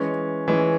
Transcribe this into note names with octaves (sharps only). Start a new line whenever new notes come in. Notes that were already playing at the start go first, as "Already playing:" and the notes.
Already playing: E3 G#3 C#4
E3 G#3 C#4